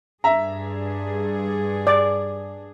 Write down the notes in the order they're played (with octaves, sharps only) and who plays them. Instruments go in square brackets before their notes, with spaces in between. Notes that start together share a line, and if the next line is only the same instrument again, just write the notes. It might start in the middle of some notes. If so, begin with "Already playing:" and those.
[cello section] G2 D4 G#4 [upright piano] E5 A#5
[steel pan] D5